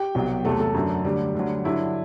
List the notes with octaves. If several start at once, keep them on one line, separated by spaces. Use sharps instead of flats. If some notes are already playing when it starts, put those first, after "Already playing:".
Already playing: G4 G5
C2 B2 F#3
E2 C3 F#3 A3 A4
A3 A4
F#2 D3 F#3
D2 D3 F#3 G3 G4
D2 D3 F#3
G2 D3 F#3 E4